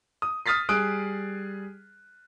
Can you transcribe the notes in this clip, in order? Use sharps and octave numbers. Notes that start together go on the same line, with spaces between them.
D#6
D#6 F6 A6 B6 C7
G3 G#4 D#6 F#6 D7